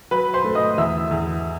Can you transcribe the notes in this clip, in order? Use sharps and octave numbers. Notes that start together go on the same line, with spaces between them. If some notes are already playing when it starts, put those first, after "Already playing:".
F#3 B4 B5
C5 C6
A3
D#5 D#6
E2 E5 E6
E2